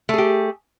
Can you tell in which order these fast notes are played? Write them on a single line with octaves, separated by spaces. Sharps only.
A3 G#4 G4